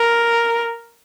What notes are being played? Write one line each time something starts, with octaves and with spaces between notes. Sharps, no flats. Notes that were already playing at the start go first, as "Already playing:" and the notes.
Already playing: A#4